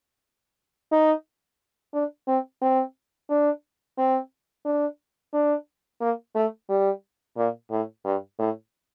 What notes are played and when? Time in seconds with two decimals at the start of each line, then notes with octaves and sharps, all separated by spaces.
0.92 D#4
1.94 D4
2.28 C4
2.62 C4
3.29 D4
3.98 C4
4.65 D4
5.34 D4
6.01 A#3
6.35 A3
6.69 G3
7.37 A#2
7.71 A2
8.05 G2
8.39 A2